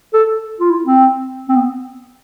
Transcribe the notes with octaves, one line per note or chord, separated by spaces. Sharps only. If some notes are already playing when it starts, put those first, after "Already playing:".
A4
F4
E4
C4
C4
B3